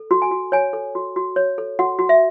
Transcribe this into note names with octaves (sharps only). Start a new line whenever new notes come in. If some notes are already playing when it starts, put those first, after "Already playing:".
Already playing: A4
F#4
G#5
F#4
C#5 G#5
A4
F#4
F#4
C#5
A4
F#4 F#5
F#4
E5